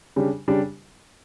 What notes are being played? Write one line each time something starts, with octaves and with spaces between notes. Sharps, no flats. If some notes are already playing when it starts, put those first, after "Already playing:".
C#3 G3 D4
C#3 G3 D4